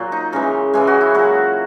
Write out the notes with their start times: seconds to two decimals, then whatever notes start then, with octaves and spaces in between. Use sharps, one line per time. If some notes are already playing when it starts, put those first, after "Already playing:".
Already playing: A#2 F#3
0.12 D#4
0.32 C#3 E3 G#3 A#4
0.73 C#3 E3 G#3 G#4
0.87 F#4
1.01 E4
1.14 A#2 F#3 F#4